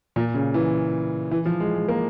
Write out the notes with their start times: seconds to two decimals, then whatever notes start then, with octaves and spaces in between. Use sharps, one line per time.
0.16 A#2
0.34 C#3
0.54 E3
1.31 E3
1.45 F3
1.60 G#3
1.75 G#3
1.88 A#3